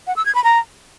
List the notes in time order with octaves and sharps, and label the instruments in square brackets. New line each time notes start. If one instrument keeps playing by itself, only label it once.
[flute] F#5
E6
G#6
B5
A#5